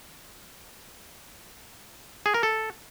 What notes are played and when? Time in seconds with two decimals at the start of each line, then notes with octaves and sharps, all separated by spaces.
2.26 G#4
2.34 A#4
2.43 A4